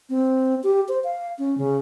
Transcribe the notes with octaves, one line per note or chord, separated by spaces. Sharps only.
C4
G4
C5
F5
C#4
C#3